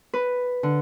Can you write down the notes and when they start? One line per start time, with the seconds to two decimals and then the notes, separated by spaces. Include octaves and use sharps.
0.14 B4
0.63 D3